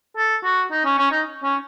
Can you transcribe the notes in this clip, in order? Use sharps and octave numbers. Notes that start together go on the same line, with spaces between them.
A4
F#4
D#4
C#4
C#4
D#4
C#4